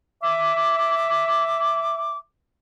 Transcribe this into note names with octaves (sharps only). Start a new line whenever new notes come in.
E5 D6